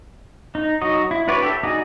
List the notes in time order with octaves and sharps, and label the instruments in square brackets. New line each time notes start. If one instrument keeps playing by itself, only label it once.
[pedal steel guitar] D#4
F#3 D#4 F#4 D#5
E4
D4 F#4 B4 C#5 D5
G4 A4 E5
D#4 F#4 G#4 D5 A#5